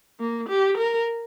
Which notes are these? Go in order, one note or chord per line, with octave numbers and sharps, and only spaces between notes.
A#3
G4
A#4